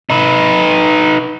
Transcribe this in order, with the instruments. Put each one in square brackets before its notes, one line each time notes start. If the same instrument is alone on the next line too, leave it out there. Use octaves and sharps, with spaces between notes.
[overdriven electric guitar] D#4 B4